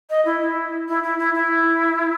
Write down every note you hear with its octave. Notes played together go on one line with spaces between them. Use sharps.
D#5
E4
E4
E4
E4
E4
E4